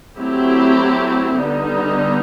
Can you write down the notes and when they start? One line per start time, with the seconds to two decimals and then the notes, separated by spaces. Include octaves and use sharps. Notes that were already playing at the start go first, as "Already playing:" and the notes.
0.18 F#3 A3 C4 E4 G4
1.39 D3 G3 B3 D#4